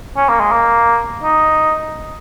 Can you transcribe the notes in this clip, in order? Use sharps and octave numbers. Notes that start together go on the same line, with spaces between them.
C#4
A#3
G#3
A#3
D#4